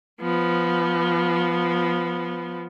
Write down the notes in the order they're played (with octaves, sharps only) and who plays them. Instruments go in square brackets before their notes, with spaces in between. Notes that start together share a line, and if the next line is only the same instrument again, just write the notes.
[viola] F3 B3